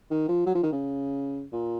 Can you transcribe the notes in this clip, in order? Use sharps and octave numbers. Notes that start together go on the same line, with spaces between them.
D#3
F3
F#3
F3
D#3
C#3
A#2